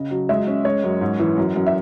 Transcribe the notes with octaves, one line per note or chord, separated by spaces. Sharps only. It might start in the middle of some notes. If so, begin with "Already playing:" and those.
Already playing: C#3 D#5
F#3
G#3 E5
C#4
G#3 C#5
F#2
G#2
E3
F#2
F#2
E5